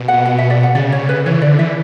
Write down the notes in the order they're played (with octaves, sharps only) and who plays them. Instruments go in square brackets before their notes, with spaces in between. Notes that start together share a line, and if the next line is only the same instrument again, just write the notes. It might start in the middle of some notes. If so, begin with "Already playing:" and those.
Already playing: [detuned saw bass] B2
[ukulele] F#5
F#5
E5
D5
F#5
[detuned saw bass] C#3 [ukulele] D5
[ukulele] C#5
B4
[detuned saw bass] E3 [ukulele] C#5
[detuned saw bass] D3 [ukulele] D5
[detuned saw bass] E3 [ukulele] E5